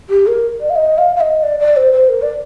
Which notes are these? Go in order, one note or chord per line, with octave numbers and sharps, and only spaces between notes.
G4
A#4
D5
F5
D#5
F5
F5
D#5
D5
D5
C5
C5
A#4
D5